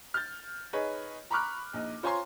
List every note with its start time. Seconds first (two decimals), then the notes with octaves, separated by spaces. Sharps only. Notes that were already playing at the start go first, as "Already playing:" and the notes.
0.14 F6 G6 A6
0.73 D#4 G#4 B4 C#5
1.31 A#5 B5 C#6 D6 F6 F#6
1.73 A#1 D#4
2.03 F4 C5 C#5 G#5 A#5 C6